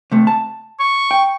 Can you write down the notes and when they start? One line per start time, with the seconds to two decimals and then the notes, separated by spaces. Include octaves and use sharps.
0.12 C3 A3
0.27 A5
0.80 C#6
1.11 G5